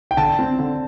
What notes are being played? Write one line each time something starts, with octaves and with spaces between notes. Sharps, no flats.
G5
D3 A5
C4
D3